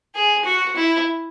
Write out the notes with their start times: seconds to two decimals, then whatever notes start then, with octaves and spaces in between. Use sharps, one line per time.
0.15 G#4
0.45 F#4
0.76 E4